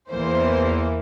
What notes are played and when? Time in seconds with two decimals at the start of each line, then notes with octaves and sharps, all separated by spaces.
0.10 E2 E3 A#3 C5